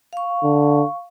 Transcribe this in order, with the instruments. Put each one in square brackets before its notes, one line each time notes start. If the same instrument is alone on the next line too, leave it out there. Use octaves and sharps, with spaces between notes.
[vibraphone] F5 C#6
[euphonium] D3